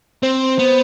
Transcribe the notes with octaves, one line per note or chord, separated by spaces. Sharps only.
C4 C5
B3